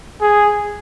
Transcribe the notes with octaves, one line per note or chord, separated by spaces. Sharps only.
G#4